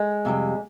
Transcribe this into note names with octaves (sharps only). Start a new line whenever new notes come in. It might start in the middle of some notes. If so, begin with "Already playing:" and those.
Already playing: G#3
F2 C3 G3